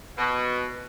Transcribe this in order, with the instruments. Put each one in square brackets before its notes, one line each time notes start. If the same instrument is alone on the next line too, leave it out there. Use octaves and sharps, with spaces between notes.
[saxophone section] B2